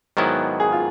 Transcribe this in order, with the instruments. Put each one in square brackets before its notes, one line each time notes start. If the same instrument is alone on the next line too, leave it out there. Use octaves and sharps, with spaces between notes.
[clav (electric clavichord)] G#2 D#3 F#3 B3 E4
[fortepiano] G#4
F4